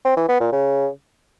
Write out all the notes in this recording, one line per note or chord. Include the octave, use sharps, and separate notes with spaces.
C4
E3
B3
A#2
C#3